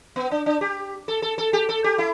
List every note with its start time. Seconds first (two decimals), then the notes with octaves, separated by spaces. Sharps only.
0.16 B3
0.31 D4
0.46 D4
0.61 G4
1.08 A4
1.22 A4
1.38 A4
1.53 G4
1.69 A4
1.84 G4
1.98 E4